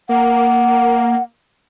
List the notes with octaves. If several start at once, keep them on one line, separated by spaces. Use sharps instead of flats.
A#3 F#5